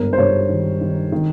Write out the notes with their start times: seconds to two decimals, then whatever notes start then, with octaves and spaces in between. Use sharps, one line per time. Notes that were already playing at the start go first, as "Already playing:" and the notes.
Already playing: G1 G#2 A#4
0.13 C5
0.18 G2 C#5
0.49 D#3
0.81 D#3
1.12 D#3